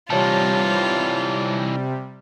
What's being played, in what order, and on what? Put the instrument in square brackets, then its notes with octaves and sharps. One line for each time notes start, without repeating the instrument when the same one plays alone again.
[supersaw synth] C3 G3 [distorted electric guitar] E3 D#4 [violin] F4 [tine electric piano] C#5 A5